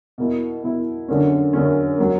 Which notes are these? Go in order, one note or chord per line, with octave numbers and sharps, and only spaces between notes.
B2 A#3 E4
B2 A#3 E4
F#2 D3 A#3 C#4
F#2 D3 A#3 C#4
F#3 A#3